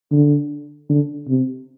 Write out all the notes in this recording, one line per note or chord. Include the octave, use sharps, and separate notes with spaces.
D3
D3
C3